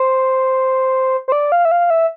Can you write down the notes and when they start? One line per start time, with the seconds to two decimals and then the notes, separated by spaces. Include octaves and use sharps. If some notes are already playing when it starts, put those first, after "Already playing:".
Already playing: C5
1.28 C5
1.32 D5
1.52 F5
1.65 E5
1.72 F5
1.90 E5